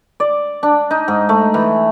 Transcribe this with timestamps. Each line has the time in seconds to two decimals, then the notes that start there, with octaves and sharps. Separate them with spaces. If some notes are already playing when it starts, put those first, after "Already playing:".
0.20 D5
0.63 D4
0.91 D#4
1.08 G#2
1.29 A3
1.54 E3